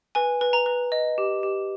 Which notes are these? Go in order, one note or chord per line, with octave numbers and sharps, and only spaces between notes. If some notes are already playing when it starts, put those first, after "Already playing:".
B4 G#5
B4
A#5
B4
D#5
G4
G4